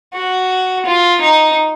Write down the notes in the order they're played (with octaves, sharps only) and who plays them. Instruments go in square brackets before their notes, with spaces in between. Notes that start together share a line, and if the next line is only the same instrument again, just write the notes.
[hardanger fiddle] F#4
F4
D#4